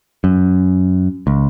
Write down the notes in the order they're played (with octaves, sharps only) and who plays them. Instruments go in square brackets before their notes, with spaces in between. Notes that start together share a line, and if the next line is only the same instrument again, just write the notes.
[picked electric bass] F#2
C#2